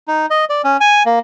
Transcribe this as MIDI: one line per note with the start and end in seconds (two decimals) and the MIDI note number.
0.08 0.26 63
0.30 0.45 75
0.50 0.62 74
0.64 0.77 61
0.81 1.03 80
1.06 1.19 58